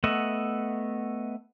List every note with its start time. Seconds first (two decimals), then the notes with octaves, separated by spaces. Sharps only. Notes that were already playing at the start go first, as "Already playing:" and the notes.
0.04 A3 B3 D#5 E5 F#5